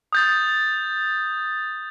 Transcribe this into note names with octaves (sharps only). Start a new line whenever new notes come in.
D#6 G6 A6